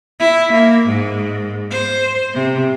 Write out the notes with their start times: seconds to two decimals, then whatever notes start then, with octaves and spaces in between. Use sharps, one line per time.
0.20 E4
0.52 A#3
0.86 G#2
1.71 C5
2.34 C3